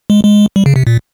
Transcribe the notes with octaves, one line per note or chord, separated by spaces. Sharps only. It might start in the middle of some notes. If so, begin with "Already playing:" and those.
G#3
G#3
G3
C#3
C3
A#2